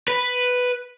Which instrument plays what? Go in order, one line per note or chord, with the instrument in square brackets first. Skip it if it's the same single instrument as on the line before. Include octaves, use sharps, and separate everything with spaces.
[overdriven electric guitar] B4